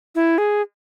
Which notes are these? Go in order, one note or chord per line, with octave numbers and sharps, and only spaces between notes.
E4
G#4